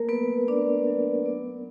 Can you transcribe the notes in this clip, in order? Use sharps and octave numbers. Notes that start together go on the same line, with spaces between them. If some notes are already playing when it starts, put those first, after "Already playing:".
Already playing: A3 A#3 A#4
F#3 B3 B4
C#4 D4 D5
F#3
B3